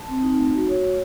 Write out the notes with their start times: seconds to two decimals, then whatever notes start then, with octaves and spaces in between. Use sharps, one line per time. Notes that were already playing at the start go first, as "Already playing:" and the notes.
Already playing: A5
0.08 C4
0.22 D#4
0.38 A3
0.54 F#4
0.68 A3 C#5
0.83 A3